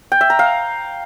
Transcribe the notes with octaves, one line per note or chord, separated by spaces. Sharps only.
G5
E5
A#5
F5